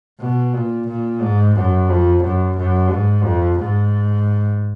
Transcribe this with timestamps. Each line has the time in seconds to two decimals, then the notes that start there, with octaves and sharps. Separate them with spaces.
0.20 B2
0.54 A#2
0.87 A#2
1.21 G#2
1.56 F#2
1.89 F2
2.23 F#2
2.57 F#2
2.91 G#2
3.24 F2
3.59 G#2